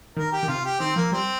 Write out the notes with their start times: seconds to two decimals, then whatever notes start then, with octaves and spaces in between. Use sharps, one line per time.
0.16 D#3 A#4
0.32 G4
0.43 D#3
0.48 C3 F4
0.65 G4
0.80 D#3 C4
0.96 F3 A#3
1.12 G3 C4